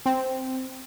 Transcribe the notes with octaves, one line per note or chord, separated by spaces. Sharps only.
C4